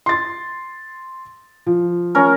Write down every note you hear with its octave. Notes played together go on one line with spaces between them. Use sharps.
C6 A6
F3
C#4 A#4